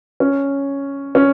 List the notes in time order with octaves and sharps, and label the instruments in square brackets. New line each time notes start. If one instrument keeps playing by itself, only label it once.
[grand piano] C#4
C#4